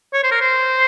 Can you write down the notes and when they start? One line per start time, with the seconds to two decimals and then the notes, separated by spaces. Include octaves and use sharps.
0.13 C#5
0.23 C5
0.32 A#4
0.41 C5